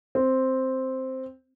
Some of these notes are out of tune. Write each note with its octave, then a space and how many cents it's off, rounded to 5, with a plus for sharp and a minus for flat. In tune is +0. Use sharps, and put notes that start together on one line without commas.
C4 +0